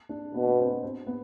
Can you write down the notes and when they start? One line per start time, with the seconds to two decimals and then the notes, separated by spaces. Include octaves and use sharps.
0.09 D4
0.34 B2 B3
0.47 B3
0.59 C4
0.70 B3
0.82 C4
1.07 B3